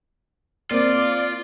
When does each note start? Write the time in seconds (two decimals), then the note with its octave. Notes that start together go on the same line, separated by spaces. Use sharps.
0.71 A#3 C4 F4 D5